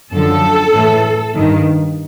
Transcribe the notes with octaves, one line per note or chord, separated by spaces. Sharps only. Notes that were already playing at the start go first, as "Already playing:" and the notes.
F#2 D3 F3 A4
A2 E3
G2 D#3